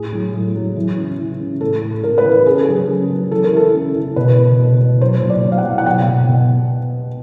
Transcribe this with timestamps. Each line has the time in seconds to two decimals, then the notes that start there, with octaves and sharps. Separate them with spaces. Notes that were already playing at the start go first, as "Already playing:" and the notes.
Already playing: A2 G#4
0.12 F#3
0.34 A2
0.55 F#3
0.76 E3
0.97 C#3
1.19 E3
1.40 C#3
1.61 A2 A4
1.83 A2
2.03 A2 A#4
2.18 B4
2.25 E3
2.31 A#4
2.46 C#3 G#4
2.55 A4
2.65 F#3 G#4
2.88 C#3
3.10 F#3
3.31 E3 A4
3.44 A#4
3.52 E3 A4
3.74 C#3
3.95 E3
4.16 B2 B4
4.38 B2
4.59 B2
4.81 B2
5.01 F#3 C5
5.22 A#2
5.30 D5
5.44 F#3
5.52 F5
5.58 F#5
5.65 F#3
5.78 F#5
5.86 B2 G5
6.08 B2
6.29 B2